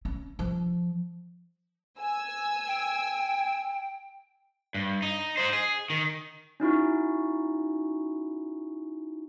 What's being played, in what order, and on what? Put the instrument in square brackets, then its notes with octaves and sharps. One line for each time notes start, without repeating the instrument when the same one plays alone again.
[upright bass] C#4
F3
[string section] G#5 E6
[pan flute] G5
[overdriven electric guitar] G2
D#4
D#4 C5
G#4
D#3
[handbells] C#4 D#4 E4 F#4